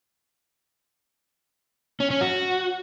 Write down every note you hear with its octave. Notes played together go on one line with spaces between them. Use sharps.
C#4
C#4
F#4